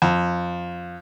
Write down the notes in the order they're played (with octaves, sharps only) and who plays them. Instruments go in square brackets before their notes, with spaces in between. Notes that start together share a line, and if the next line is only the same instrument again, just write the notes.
[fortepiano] F2